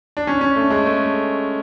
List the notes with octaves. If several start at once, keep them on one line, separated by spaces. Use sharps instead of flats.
D4
C#4
C#4
A3
G#3
A3